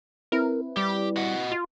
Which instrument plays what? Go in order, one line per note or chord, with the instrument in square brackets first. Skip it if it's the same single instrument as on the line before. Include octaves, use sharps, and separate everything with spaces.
[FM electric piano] C4 E4 B4 [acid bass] A#4
[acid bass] G3 [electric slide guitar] G4
[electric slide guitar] F#4 D#5 F#5
[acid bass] F4